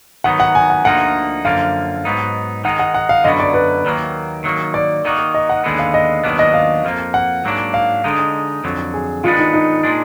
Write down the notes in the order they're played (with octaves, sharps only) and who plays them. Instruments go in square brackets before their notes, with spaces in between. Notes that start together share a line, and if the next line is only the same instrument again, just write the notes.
[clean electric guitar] D#3 F#3 B3 D#4 [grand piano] F#5
[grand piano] F#5
G#5
F#5
[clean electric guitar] D2 D3 F3 A#3 D#4 [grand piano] F#5
[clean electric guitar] F#2 D3 F3 A#3 [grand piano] F5
[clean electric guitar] G#2 F#3 B3 D#4
[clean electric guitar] D#3 G#3 D#4 [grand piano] F#5
[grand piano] F#5
F#5
F5
[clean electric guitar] F#2 D3 F#3 B3 [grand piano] D#5
[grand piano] D5
B4
[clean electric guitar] D#2 D#3 F#3 A#3
D#3 F#3 A#3
[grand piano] D5
[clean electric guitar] D#3 A#3 D#4 F#4
[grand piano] D#5
F#5
[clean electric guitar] D#2 D3 G#3 B3
[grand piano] F5
D#5
[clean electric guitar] D#2 D#3 F#3 B3 D4
[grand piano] D#5
F5
[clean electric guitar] F2 F3 A#3
[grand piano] F#5
[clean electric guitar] G#2 F#3 A#3 D4
[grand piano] F5
[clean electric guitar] D3 G#3 D#4
F2 D3 F#3
[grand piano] G#4
[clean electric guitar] D#3 G#3 B3 D4 [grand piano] F4
[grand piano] D#4
D#4
[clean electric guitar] A#2 G#3 D4